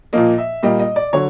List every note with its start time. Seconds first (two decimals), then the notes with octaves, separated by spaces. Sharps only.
0.13 A#2 F3 A#3 D#5
0.38 E5
0.63 A#2 G3 A#3 D#5
0.79 D#5
0.96 D5
1.13 D3 F#3 C#5